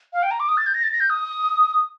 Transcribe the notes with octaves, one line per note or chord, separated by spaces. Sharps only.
F5
G5
A#5
D6
D#6
A6
G6
A#6
A6
A#6
G6
D#6